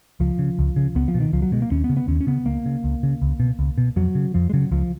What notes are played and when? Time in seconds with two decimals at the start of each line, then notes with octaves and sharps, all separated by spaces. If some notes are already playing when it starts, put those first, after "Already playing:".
0.20 C#2 F3
0.39 C#3
0.59 C#2
0.76 C#3
0.95 C#2 B3
1.08 F3
1.15 B2
1.20 D#3
1.33 C#2 F3
1.42 F#3
1.52 B2 G#3
1.62 A#3
1.71 D#2 C#4
1.84 B3
1.89 C#3
1.97 B3
2.08 D#2 C#4
2.21 C#4
2.27 C#3 B3
2.46 C#2 A#3
2.65 C#3
2.84 C#2
3.03 C#3
3.22 C#2
3.40 B2
3.59 C#2
3.78 B2
3.96 F2 F#3
4.15 C#3
4.34 F2 F3
4.50 G#3
4.54 C#3 F#3
4.71 C#2 F3